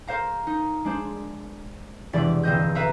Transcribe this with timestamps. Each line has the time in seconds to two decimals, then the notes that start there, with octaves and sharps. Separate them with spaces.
0.07 A#4 C5 F5 A#5
0.47 D#4
0.85 G#3 D4 C5
2.13 E1 C3 E3 D5 A6
2.43 G1 C4 D#5 G6
2.75 A4 B4 E5 F5 A#5